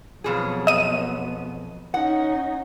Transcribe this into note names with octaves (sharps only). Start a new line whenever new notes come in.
F2 B2 F#3 B3 G#4
D#5 D#7
C#4 D#4 F#5